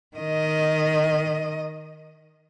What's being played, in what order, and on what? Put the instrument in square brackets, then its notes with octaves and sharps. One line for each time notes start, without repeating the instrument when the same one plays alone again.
[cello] D#3 D#5